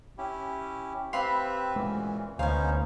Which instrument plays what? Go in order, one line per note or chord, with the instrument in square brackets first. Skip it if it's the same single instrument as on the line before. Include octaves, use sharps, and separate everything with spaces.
[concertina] C#4 E4 G4
[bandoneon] C4 [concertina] G4 B4 E5 [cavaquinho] F5 B5 C6
[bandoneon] A#2 E3 [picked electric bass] G#3 [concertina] C#4 F#4
[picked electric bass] D2 [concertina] B3 [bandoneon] C#4 D#4 C5 [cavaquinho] F5 G#5